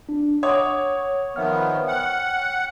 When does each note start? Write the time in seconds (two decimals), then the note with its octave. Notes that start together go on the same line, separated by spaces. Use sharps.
0.09 D4
0.43 C#5 F#5 D6 D#6
1.36 D#3 F3 B3 E5 F#5 F6
1.88 F#5 G5 F6